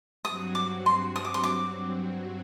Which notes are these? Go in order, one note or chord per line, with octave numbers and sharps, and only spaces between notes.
G2 F#3 C4 F#4 D#6
D6
C6
D#6
D6
C6
D6